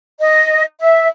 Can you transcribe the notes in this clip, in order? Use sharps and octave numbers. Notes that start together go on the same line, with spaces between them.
D#5
E5